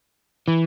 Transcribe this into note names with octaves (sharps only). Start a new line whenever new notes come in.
E3